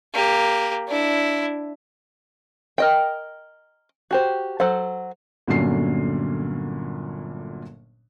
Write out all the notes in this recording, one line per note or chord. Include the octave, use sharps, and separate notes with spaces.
A#3 G4
D4 E4
A#4 D#5 G5
F#4 G4 C5
F#3 A4 C5 F#5
G1 A#2 D3 F#3 C#4 C7